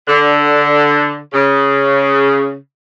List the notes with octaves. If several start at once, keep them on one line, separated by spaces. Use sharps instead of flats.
D3
C#3